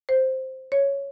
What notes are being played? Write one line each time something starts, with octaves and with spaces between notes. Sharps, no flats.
C5
C#5